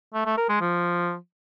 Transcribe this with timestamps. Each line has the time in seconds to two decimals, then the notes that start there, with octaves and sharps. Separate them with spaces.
0.14 A3
0.26 A3
0.37 A#4
0.49 G#3
0.61 F3